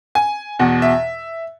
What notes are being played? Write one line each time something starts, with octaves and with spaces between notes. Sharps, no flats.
G#5
E2 B2 F#5
E5